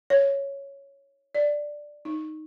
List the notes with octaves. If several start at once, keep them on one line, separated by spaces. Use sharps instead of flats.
C#5
D5
D#4